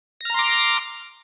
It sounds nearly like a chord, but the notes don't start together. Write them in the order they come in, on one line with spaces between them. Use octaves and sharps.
A#6 F6 A#5 C6 D6